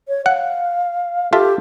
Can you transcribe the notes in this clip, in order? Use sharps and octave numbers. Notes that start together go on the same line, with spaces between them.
C#5
F5 F#5
F4 G4 A4 E5